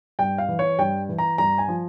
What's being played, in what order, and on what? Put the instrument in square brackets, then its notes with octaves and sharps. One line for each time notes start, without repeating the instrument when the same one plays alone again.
[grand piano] G2 G5
F5
E3
C#5
G2 G5
E3
A#5
G2 A#5
G#5
F3